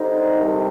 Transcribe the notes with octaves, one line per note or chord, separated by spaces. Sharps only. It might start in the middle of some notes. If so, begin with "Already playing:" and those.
Already playing: D3 G3 C4 D#4
C2 C3 D#3 G3